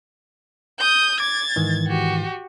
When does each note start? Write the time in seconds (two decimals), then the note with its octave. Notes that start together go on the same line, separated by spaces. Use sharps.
0.79 D#6 G6
1.20 D6 G#6 A6
1.56 G#2 D#3 E3
1.87 F#4 G4